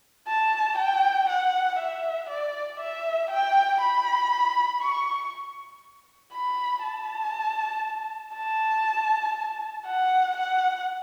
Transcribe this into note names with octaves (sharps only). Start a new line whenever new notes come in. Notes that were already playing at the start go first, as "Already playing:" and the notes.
A5
G5
F#5
E5
D5
E5
G5
B5
C#6
B5
A5
A5
F#5
F#5